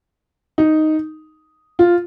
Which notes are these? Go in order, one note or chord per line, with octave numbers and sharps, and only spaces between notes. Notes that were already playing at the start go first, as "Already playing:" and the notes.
D#4
F4